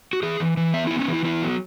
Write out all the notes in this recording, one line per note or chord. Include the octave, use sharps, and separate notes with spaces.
F#4
E3 G#4
E3
E3
B3 E5
B3 E4
C#4
E3
E4
B3 E4
F#3